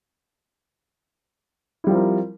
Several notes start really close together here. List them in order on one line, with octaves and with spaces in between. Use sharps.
E4 G3 F3 C4 A#4